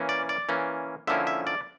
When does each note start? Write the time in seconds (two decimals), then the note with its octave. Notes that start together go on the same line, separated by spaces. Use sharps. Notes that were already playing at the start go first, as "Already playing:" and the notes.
Already playing: E3 A#3 C#4
0.09 D5
0.29 D5
0.49 E3 A#3 C#4
1.07 D3 F3 A#3 C#4 E4 E5
1.27 E5
1.47 D5